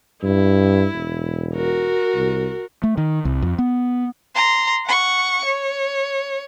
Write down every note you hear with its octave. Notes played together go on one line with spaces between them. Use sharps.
G2 E4
E1
F#4 A#4
C2
A3
D#3
C2
F2
B3
A#5 C6
F#5 C#6
C#5